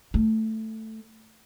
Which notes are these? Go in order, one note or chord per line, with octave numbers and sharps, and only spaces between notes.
A3